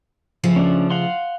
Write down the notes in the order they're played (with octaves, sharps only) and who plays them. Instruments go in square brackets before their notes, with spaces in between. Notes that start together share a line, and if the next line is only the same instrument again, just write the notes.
[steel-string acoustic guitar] C#3 F3 A3
[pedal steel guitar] C#4 D4
F5 F#5 C6